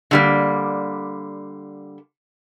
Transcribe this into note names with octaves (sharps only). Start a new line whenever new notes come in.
D3 G3 A#3